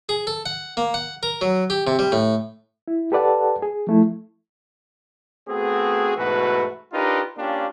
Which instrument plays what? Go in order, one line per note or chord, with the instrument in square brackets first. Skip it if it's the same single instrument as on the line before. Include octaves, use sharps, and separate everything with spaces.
[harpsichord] G#4
A4
F#5
A#3
F#5
A#4
F#3
G4
C3
G3
A2
[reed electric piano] E4
G4 A4 B4 D5 F#5 A5
G#4
F3 A3 E4
[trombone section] A3 B3 C4 F#4 G#4
G#2 B2 E3 A3 F#4 B4
D4 D#4 F4 G4 A#4 B4
A#3 C#4 D4 F4 G4